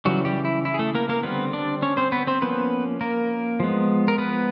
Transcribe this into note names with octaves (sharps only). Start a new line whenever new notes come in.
C#3 E3 F#3 G3 F#4
G3 G4
E4
E4
G#4
A3 A4
A#3 A#4
A#3 A#4
D3 G3 B3 C4 B4
D4 D5
C#4 C#5
C4 C5
B3 B4
C4 C5
F3 A#3 B3 C#4 B4
A#3 A#4
F3 G#3 B3
A#4
B3 B4